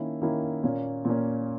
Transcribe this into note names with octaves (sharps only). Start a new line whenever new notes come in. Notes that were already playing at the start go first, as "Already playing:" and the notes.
Already playing: D#3 A#3 C#4 E4
D#3 A#3 C#4 E4
A#2 A#3 C#4
A#2 A#3 C#4